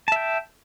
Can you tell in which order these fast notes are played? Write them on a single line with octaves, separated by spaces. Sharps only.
A5 E5 G5